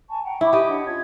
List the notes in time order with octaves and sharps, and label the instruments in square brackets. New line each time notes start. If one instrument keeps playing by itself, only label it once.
[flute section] G#5 A5 C#6
F#5 G5 A#5
[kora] E4 [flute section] B5 C#6 D6
[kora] G4 D#5
[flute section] D4 C#5 F#5
C#4 F4 G#6